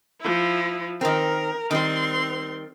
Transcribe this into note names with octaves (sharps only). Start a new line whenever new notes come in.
F3 E4
D#3 C4 A#4
D#3 G3 C4 C6